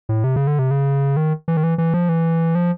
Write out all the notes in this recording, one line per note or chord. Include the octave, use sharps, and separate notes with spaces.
A2
C3
C#3
D3
C3
C#3
D#3
E3
D#3
E3
E3
F3
E3
F3